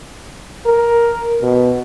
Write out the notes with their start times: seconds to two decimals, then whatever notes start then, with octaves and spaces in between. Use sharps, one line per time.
0.66 A#4
1.42 B2